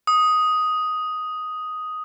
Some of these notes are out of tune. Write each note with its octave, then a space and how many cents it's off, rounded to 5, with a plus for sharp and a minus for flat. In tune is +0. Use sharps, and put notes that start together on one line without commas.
D#6 +5